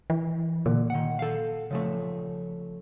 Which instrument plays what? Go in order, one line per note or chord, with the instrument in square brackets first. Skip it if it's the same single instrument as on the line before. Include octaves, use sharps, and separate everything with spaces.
[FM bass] E3
[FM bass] A#2 [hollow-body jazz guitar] D3
[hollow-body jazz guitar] D#3 F#5
A4 F5
C#3 F3 A3